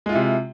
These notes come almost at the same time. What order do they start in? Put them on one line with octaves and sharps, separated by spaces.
G#3 F4 E4 C3